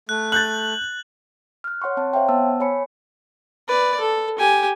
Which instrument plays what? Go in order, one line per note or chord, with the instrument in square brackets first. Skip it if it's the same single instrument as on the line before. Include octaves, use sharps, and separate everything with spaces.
[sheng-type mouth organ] A3 [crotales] F#6
[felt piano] F#6 G6 A6 [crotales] F#7
[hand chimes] F6 F#6
C#5 F#5 C6 C#6
C4 C#5 A5
C5 C#5 E5 F5 G5 C6
B3 C5 F#5 A5 E6
C#5 G#5 B5 C#7
[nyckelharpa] B4 D5
A4
G4 G#5